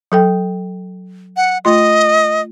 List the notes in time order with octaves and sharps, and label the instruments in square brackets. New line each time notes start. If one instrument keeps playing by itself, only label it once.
[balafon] F#3 A4 G5
[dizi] F#5
[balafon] A3 F4 C6 [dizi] D#5